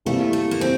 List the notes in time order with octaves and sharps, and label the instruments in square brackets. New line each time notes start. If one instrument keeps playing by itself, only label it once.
[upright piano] C3 G3 A#3 E4 [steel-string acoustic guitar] A3
[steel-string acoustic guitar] A3
A#3
C4